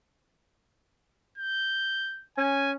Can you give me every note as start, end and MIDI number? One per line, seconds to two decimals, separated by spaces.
1.38 2.25 91
2.38 2.75 61
2.38 2.72 80